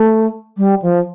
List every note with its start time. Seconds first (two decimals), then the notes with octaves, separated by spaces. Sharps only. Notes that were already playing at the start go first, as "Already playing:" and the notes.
Already playing: A3
0.57 G3
0.82 F3